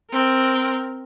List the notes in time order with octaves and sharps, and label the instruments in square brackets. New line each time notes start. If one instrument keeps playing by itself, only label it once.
[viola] C4 A#4